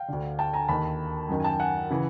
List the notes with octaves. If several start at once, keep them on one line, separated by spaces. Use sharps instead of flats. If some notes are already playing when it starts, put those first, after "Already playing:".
Already playing: F5 G5
D2 D3
G5 A5
G#5 A#5
D#2 D#3 A5 B5
F#2 D#3
G#5
G5 A5
F#5 G#5
C#3 E3